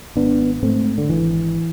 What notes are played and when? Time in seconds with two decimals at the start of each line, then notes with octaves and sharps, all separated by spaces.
0.16 G#1 B3 D4
0.62 G#2 A3 C4
0.98 D3
1.09 G#1 E3